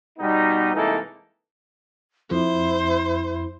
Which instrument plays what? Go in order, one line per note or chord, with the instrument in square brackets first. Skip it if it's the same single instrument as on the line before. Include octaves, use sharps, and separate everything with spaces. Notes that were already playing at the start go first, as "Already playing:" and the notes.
[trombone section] B2 G3 B3 D#4
C2 E3 G#3 A#3 D#4 A4
[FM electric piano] F2 [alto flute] E4 [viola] C5